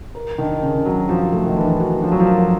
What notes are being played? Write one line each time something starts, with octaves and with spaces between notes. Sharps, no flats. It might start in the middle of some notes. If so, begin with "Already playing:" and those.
A#4
D#3 D4
C#3 D4
F#3 F#4
F3 F#4
A3
D#3
E3 D4
F#4
F3 D4
F#3
F3
A#4